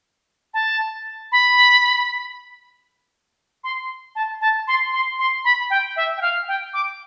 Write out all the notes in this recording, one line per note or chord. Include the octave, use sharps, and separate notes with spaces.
A5
B5
C6
A5
A5
C6
C6
C6
B5
G5
E5
G5
F5
G5
D6